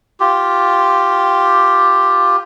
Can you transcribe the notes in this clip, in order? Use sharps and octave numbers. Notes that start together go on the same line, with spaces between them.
F4 G4